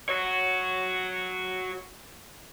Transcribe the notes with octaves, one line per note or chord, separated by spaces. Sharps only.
F#4 C#5